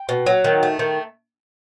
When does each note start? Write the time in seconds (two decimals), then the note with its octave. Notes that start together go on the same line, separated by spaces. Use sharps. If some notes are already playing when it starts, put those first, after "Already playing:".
Already playing: G5
0.09 B2
0.26 F#3
0.44 D#3
0.63 A3
0.79 D#3